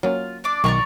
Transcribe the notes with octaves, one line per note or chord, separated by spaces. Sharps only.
F#3 A#3 C#4 F4
D4 D5 D6
B1 D#3 D5 A#5 C#6